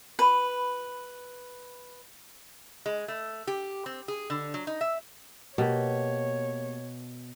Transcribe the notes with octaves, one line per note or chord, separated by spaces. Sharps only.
F4 B4 B5
G#3
A3
G4
C4
G#4
D3
F#3
D#4
E5
B2 A#3 G4 C#5